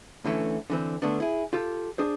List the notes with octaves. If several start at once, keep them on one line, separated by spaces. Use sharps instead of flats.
D2 D3 E3 A3 C#4
D3 E3 C4
D3 A3 B3 D4
E4 G#4
F4 G4 A4
D4 G#4 C5